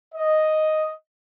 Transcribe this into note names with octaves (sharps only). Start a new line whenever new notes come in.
D#5